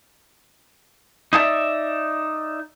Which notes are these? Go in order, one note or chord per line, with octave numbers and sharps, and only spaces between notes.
D#4 E4 A4 D5 E5